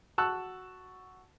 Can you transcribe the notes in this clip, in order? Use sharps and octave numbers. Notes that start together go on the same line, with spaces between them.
F#4 A5 C#6 E6 F#6